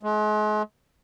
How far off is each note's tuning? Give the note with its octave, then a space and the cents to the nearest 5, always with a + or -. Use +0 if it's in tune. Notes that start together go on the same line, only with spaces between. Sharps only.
G#3 +40